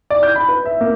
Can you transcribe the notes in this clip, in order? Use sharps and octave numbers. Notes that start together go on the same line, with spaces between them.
D5
G6
B5
B4
E5
A#3